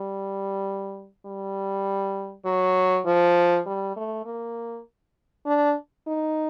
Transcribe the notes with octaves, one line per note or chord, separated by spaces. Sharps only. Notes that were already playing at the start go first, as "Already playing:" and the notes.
Already playing: G3
G3
F#3
F3
G3
A3
A#3
D4
D#4